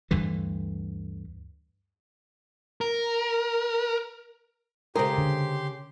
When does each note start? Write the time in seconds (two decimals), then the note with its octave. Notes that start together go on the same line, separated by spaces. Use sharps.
0.11 D2 G2 D3 E3
2.81 A#4
4.96 C#3 G#3 G4 A#4 C5 C6
5.18 D3